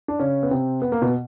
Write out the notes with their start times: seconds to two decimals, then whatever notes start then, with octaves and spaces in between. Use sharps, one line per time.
0.08 D4
0.20 C#3 C#4
0.43 B3
0.51 C3 C4
0.82 B3
0.92 A#3
1.01 B2 B3